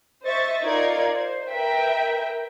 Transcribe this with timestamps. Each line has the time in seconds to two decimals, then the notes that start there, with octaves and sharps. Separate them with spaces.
0.23 C5 D#5 E5 C#6 A6
0.63 D#4 F4 A#4 D5 G#6 C#7
1.12 C5
1.50 A#4 B4 E5 G5